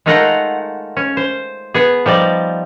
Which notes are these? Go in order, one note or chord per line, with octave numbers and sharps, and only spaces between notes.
G#3 A3 D#4 F4 A#4 F#5
C#4
C5
B3 G#4
F3 G3 D#4 D5